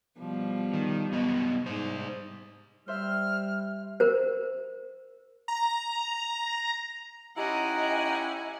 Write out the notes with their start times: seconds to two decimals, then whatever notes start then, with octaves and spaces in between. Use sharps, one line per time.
0.19 B2 F3 G3
0.74 D#3
1.12 F#2 B3 D#5
1.66 G#2 G3 C5
2.88 G3 C5 E5 F6
4.00 A#4 C5
5.48 A#5
7.37 C#4 D#4 E4 G4 D#5 F#5 G#5 A#5